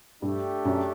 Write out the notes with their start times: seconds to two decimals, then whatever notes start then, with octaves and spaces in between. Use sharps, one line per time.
0.22 G2 A3 D4 G4
0.65 F#2